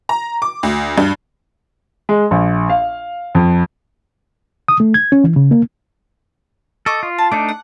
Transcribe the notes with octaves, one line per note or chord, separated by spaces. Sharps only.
A#5
D6
D2
G2
G#3
A#1
F5
F2
D#6
A3
G#6
C#4
E3
C#3
A#3
A4 D#5 C#6 D6
F4
A5
A3 D4 D#4 D6
F#5